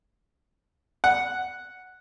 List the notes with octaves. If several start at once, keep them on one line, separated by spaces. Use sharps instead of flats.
F#5